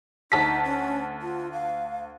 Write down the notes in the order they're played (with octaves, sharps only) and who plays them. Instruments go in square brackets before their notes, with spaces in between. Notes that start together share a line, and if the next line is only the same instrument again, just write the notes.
[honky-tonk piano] D2 A5 B6 [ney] D#4
[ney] C#4
F4
F5